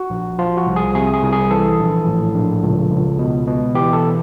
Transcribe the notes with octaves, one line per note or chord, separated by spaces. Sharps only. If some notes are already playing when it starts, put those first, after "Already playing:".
Already playing: F#4
A#1
F3 F4
F#4
C2
G#4
C3 G#4
G#4
C2
G#4
E3 A4
A#1
A2
A#1
C#2
C#2
B2
B2
E3 G4
A4